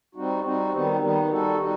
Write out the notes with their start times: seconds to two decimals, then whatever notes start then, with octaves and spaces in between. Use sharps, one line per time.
0.15 G3 C4 D#4 F#4
0.44 G3 C4 D#4 F#4
0.72 D#3 G3 B3 D#4
1.01 D#3 G3 B3 D#4
1.29 G3 D#4 F#4 A4
1.58 G3 D#4 F#4